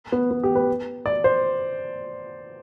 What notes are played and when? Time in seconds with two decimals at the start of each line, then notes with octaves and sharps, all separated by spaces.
0.12 B3
0.31 B3
0.43 G4
0.55 B4
1.06 D5
1.24 C5